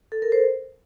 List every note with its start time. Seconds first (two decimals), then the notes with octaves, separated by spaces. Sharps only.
0.12 A4
0.22 A#4
0.32 C5